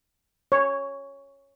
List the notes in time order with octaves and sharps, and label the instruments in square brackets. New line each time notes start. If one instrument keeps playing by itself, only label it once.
[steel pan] C#5